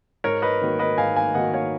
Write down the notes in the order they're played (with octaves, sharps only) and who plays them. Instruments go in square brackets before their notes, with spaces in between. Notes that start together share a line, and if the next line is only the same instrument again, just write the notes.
[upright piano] G#2 [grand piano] A#4 C#5
[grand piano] B4 D#5
[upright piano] D#3 A#3 D#4 F#4
[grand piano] B4 D#5
[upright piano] G#2 [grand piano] F5 G#5
[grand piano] F5 G#5
[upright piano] D#3 A#3 D#4 F#4 [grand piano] D#5 F#5
[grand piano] C#5 F5